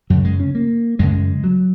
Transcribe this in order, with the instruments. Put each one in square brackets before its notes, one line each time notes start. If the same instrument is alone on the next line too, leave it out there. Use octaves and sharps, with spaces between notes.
[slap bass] F#2 C#3 F#3
G#3
C#4
A#3
F#2 C#3 G#3
F#3